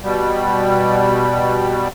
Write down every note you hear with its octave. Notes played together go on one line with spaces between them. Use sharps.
B2 G3